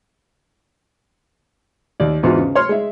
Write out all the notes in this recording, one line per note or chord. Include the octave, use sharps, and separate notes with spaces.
D#2 D5
E2 G#2 D3 F4 F#4
C#3
C#5 C6 F6
G#3 E5